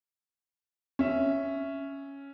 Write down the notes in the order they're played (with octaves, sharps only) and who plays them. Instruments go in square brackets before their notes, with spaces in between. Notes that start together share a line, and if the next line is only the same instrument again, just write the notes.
[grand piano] C#4 E5